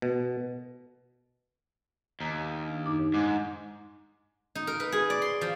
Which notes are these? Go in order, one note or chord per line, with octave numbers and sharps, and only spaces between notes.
B2
D#2 A#5
D4
F#2 D#4 D6
G#2 D6
D#4
A#4
B4
G#4
D5
C6
F3